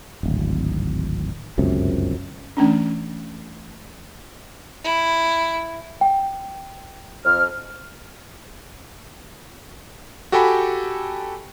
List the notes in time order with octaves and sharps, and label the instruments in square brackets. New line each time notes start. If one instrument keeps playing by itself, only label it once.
[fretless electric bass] D1 G#1
G1 C#2 F#2 C3
[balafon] E3 A3 C#4 D4
[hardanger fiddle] E4
[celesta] G5
[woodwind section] F2 F6
[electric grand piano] F#4 G4 A4 G5 G#5 B5